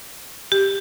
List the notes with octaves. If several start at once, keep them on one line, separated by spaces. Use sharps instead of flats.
G4